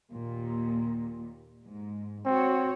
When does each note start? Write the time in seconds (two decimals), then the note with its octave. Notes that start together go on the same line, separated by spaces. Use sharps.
0.12 D#2 A#2
1.65 G#2
2.26 C4 F#4 C#5